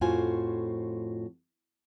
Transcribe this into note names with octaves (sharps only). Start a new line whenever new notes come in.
F2 A2 F4 F#4 C5 G#5